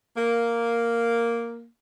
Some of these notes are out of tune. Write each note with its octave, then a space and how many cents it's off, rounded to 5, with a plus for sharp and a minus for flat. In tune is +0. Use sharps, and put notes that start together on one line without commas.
A#3 +0